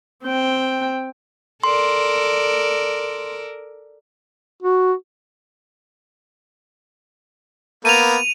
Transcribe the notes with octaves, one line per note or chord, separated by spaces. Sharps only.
C4 G5
A4 A#4 D5 C6
F#4
A#3 B3 D#7 F7